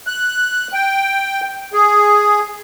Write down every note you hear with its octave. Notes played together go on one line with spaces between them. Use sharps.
F#6
G5
G#4